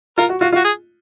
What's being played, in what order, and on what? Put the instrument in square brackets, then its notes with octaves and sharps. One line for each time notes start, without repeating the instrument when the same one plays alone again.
[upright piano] F4 [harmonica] A#4
[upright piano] F#4
[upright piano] F4 [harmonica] F#4
[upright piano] F4
[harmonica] F#4
G#4